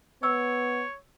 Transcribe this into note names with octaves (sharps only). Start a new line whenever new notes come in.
B3 C#5 C#6 E6